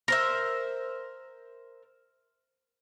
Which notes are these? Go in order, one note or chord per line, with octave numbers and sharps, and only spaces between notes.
A#4 C5 E5